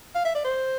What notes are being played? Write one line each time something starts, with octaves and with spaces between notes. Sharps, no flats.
F5
E5
D5
C5